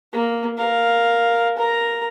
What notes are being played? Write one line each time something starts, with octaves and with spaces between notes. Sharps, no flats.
A#3
A#4 F5
A#4 A#5